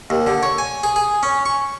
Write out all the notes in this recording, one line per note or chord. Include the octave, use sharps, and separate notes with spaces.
D#2
D3
C#5
G#5
G#4
G#4
C#4
C#6